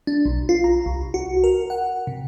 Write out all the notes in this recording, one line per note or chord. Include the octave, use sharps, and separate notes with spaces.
D4
B1
F4
A#5
C2
F#4
A#4
F#5
C3